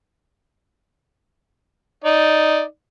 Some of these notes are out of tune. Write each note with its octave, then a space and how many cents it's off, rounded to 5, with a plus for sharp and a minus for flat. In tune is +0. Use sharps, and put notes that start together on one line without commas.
D#4 +0 D5 +0